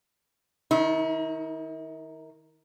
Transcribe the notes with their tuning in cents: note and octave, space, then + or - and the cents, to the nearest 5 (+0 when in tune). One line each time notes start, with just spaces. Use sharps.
D#3 +0 E4 -45